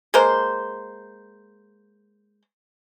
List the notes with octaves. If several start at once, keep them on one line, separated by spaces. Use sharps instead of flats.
G#3 A#3 C5